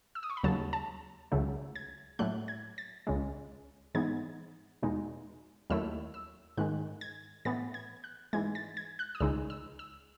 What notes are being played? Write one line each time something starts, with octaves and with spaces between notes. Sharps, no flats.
E6
D#6
C#6
B5
D#2 C#3 F#3 A5
A5
C#2 C#3 F#3 A3
G#6
A2 F#3 A3 F#6
G#6
A6
C#2 C#3 G#3
G#2 E3 B3 D#4 G#6
E2 B2 G#3 D#4
D#2 D#3 F#3 A3 E4 E6
E6
G#2 D#3 G#3 F#6
G#6
A2 E3 B3 A6
G#6
F#6
G#2 E3 G#3 G#6
A6
G#6
F#6
D#6
C#2 C#3 G#3 D#4 E6
E6
E6